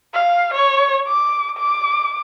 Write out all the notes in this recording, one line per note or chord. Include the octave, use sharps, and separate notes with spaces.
F5
C#5
D6
D6